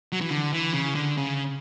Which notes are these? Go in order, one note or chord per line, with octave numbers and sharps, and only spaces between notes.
F#3
E3
D3
E3
C#3
D3
C#3